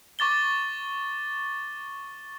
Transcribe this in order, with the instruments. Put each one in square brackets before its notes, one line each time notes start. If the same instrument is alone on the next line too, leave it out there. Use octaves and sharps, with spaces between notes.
[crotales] C#6 D6 A6 G7